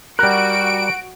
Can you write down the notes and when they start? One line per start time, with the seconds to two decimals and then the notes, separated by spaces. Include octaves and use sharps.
0.19 G3 F#4 A#4 F#6 D7